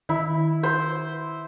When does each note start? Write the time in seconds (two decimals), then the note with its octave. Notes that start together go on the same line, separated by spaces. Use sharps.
0.09 D#3 E4
0.63 C5